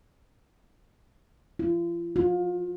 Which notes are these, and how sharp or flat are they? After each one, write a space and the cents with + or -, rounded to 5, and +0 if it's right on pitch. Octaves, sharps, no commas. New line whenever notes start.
F4 -40
F4 +30